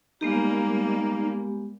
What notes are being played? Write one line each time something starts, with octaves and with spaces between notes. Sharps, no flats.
G3 G#3 A#3 B3 D#4 G4